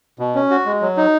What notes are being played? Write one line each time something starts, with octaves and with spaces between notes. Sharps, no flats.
B2
C#4
F#4
G#3
F#3
D#4